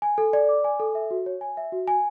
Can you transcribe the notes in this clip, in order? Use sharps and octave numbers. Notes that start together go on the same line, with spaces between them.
G#5
A4
D5
D6
G#5
A4
E5
F#4
C#5
G#5
E5
F#4
G#5